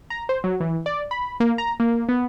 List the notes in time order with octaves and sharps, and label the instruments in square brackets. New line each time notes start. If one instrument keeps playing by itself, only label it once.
[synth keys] A#5
C5
F#3
E3
D5
B5
A#3
A#5
A#3
B3